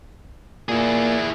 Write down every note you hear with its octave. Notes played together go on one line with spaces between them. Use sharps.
A#2 E4 G#4